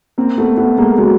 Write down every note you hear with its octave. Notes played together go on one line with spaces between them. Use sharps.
A#3 C4
A3 B3
A3 B3
G#3 A#3
F#3 G#3